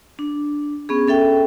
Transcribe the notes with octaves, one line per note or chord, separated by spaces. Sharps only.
D4
B3 C#4 G#4
C#4 A4 E5 G5